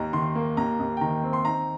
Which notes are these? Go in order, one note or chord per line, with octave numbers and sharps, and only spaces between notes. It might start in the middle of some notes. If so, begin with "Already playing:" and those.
Already playing: D#2 D#4 A#5
D#3 C6
A#3
D#2 A#5
D#2
G5
D#3 A#5
C4
C6
D#4 A#5